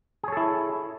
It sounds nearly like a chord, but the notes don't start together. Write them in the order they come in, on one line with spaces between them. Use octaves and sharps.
G#4 C#5 A4 E4